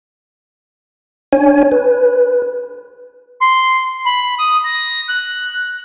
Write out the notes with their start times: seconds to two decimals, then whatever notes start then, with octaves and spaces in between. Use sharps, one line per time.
1.33 D4 C#5 G#5
1.72 B4
3.40 C6
4.05 B5
4.38 D#6
4.64 A#6
5.08 F#6